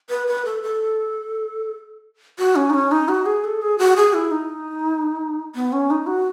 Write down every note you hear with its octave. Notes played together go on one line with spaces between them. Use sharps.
B4
B4
A4
A4
F#4
C#4
D#4
C#4
D#4
F#4
G#4
A4
G#4
F#4
G#4
E4
D#4
B3
C#4
D#4
F#4